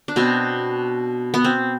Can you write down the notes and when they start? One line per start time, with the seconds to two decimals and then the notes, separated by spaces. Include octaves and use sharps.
0.08 D4
0.16 B2 B3 C4
1.34 B3
1.44 C4